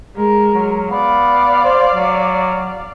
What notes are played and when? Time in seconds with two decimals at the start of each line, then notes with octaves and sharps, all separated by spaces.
0.16 G#3 A#4
0.54 F#3
0.91 B3 D5 F5
1.65 C5
1.95 F#3